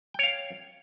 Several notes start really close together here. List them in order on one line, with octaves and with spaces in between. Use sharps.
G5 C#5 F5